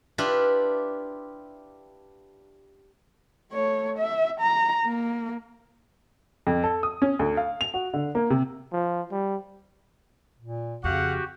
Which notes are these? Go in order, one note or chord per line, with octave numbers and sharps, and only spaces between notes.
D4 E4 F4 G4 B4
A3 C#5
E5
A#5
A#3
F2
A4
D#6
C#4
D2
F5
F7
F#4
D3
A#3
C3
F3
G3
A#2
F2 C#3 F#4 G4 F5 F#5